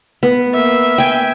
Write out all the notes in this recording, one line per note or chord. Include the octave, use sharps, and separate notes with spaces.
B3
A#3 E5
G5 G#5